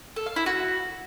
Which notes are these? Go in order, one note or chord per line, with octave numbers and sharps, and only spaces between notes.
A4
F5
E4
F#4